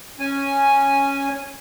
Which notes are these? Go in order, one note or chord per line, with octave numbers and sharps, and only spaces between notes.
C#4 G#5